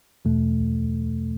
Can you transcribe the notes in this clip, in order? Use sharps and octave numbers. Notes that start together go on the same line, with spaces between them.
E2 B2 A3